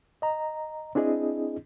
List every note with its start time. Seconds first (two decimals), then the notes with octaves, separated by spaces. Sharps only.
0.22 D#5 A#5
0.95 C4 D4 E4 G#4 D#5